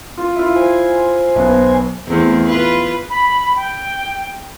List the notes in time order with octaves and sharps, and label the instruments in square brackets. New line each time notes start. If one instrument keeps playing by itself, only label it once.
[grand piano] F4
E4 F4
[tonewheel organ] C5 G#5
[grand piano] B1 B3
[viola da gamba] E2 A3 C4
F4 B4
[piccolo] B5
G5